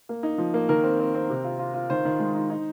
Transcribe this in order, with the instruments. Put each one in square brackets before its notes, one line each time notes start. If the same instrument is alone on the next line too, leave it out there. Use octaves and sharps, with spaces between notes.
[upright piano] A#3
D#4
F3
A#3
D#3 A#4
C4
C4
C4
C3
F4
F4
F4
D#3 C5
D#3
G#3
D#4
D#4